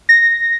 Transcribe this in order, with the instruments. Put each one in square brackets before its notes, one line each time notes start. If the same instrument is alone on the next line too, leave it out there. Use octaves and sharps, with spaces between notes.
[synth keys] A#6